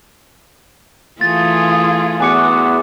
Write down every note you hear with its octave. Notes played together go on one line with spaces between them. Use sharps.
E3 A3 F4 G#4 A6
E2 B3 F#4 G#5 D6 C#7